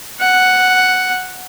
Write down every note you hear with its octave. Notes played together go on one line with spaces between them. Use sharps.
F#5